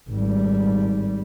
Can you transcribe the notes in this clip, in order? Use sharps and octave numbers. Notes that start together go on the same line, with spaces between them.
G#1 G3